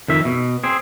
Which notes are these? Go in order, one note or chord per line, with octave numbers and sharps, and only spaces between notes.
F2 D#3 E5
B2
C4 G#4